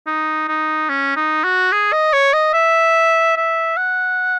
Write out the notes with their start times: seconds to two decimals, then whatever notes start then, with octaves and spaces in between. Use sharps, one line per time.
0.07 D#4
0.48 D#4
0.89 C#4
1.16 D#4
1.44 F#4
1.72 G#4
1.93 D#5
2.13 C#5
2.33 D#5
2.53 E5
3.37 E5
3.77 F#5